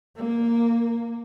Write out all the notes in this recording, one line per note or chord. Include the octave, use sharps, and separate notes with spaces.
A#3